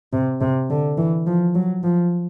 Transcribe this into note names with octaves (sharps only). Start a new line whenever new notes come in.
C3
C3
D3
E3
F3
F#3
F3